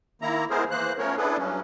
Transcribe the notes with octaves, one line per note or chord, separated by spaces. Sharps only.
D#3 A#3 E4 A#5
G#3 B3 E4 G#4 A#4 C5
E3 A#3 C5 F#6
F3 A3 B3 C#4 A#4 C#5
B3 D4 E4 G#4 A4 B4
G2 F#3 C#4